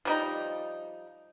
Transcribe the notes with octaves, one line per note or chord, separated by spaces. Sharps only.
F3 G3 D#4